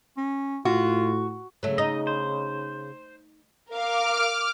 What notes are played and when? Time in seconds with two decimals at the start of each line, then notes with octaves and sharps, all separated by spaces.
0.17 C#4
0.65 A2 F4 F#4
1.63 C#3 F#3 A3
1.78 D#4 D#5
2.07 C5
3.71 A#4 F5 D6 F6